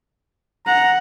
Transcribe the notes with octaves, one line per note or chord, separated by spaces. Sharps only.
F#5 A#5